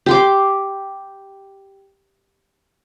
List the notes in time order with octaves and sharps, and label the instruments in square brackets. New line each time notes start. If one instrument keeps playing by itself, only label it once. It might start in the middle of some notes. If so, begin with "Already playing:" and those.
[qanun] G4 C6 D6